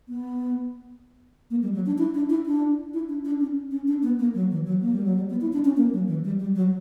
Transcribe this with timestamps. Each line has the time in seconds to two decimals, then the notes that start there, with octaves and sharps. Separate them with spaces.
0.08 B3
1.50 A#3
1.62 G3
1.75 F#3
1.86 D4
1.98 E4
2.14 D4
2.30 E4
2.46 D4
2.93 E4
3.09 D4
3.25 D4
3.40 C#4
3.71 C#4
3.87 D4
4.03 B3
4.19 A#3
4.34 F#3
4.51 E3
4.66 F#3
4.81 A#3
4.93 G3
5.04 F#3
5.15 G3
5.30 B3
5.41 E4
5.53 D4
5.65 C#4
5.77 A#3
5.93 F#3
6.08 E3
6.24 G3
6.39 G3
6.55 F#3